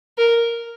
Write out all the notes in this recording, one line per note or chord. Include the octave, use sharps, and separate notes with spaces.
A#4